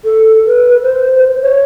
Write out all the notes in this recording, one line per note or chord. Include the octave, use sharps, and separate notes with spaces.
A4
B4
C5
C#5